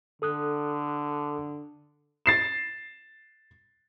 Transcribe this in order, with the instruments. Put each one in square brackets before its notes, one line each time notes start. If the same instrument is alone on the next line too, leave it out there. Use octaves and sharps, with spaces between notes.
[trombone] D3 [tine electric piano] A4 D#6 F#6
[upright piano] A6 C7 E7